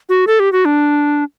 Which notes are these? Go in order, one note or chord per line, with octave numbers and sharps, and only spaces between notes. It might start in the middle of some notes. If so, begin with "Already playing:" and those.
F#4
A4
G4
F#4
D4